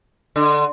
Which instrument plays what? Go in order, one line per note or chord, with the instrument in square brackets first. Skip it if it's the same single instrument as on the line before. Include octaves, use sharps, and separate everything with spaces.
[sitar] D3